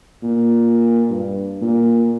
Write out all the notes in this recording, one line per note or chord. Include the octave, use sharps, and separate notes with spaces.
A#2
G2
A#2